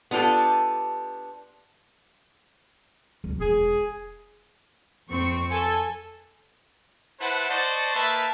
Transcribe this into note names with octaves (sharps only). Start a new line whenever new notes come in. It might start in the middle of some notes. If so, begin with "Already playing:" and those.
B3 D4 F4 G4 A4
D2 C3
E1 E3 G#4
F2 C4 C#6
A4 G#5
E4 B4 C5 F#5 A5
C5 D5 D#5 A5 C#6
A#3 B4 E5 A5